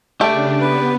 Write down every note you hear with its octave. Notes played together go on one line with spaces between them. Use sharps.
C#3 A3 D4 G4 D5
B3 B4